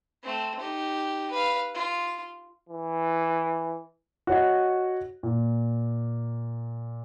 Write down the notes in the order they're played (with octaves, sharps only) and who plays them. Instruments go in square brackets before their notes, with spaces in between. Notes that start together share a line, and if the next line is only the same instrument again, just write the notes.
[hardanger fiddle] A3 C4
D#4 G4
B4 F5
F4
[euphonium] E3
[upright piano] F#4 C#5 D#5
A#2